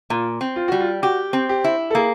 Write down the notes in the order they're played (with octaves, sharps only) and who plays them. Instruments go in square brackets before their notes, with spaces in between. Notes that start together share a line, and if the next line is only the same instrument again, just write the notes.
[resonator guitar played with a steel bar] A#2 [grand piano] F4
[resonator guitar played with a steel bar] C4
[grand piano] F4
[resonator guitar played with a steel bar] G3 [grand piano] F#4
[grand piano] F4
[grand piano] F#4 [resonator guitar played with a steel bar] G4
[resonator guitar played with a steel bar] C4
[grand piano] G4
[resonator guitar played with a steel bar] E4
[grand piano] A4
[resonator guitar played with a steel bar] A#3 [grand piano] G#4